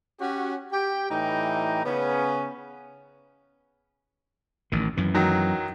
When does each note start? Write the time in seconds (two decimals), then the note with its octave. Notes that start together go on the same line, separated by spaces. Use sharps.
0.20 C#4 F#4 G4
0.72 G4 G5
1.10 A2 E3 G3 D#4 G5 A#5
1.85 C#3 B3 C#4
4.72 A1 D#3
4.97 F#2 E3
5.15 D#3 F#3